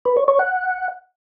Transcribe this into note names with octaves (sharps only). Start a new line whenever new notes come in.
B4
C#5
C#5
F#5